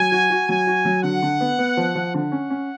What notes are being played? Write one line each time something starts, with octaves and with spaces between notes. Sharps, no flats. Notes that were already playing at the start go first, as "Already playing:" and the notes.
Already playing: F#3 G#5
F#4
F#4
F#3 G#5
F#4
F#3
D3 F#5
D3
B3
B3
F3
F3
D3 F#5
C#4
C#4